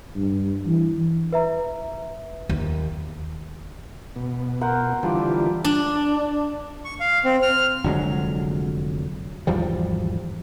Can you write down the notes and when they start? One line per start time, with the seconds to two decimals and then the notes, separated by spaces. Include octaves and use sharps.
0.16 G2
0.67 E3
1.33 B4 E5 A#5
2.49 D#2
4.16 B2
4.61 A#4 C5 F#5
5.03 D3 E3 F3 G3 C5 D5
5.64 D4
6.85 C#6
7.00 F5
7.25 C4
7.42 F6
7.84 F1 D3 F#3 G#3
9.47 G#1 E2 F3 G3